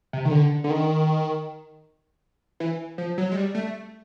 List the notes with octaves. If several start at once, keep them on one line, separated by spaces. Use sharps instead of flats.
C3
D#3
D3
D3
D#3
E3
F3
F#3
G#3
G3
A3